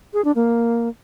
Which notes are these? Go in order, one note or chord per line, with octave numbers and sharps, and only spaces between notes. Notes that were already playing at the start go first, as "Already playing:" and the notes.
G#4
D4
A#3